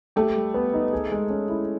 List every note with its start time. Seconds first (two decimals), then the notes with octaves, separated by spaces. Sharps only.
0.16 A3 G4
0.35 G3
0.54 B3
0.74 D#4
0.93 G#4
1.12 G#3
1.30 C#4
1.49 E4